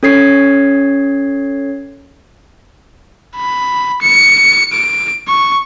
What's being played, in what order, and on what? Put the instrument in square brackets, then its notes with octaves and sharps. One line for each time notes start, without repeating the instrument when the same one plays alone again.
[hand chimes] C#4 A4 C#5 G#6 C7
[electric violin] B5
C#7
D7
C#6